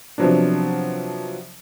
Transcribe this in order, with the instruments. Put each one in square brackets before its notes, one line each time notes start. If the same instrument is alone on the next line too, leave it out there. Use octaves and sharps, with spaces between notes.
[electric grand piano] C3 F3 F#3 B3 D4